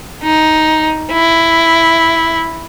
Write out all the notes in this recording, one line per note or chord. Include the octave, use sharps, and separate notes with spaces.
D#4
E4